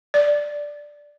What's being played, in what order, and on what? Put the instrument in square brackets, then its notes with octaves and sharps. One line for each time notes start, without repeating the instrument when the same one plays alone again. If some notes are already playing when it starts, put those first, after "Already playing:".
[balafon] D5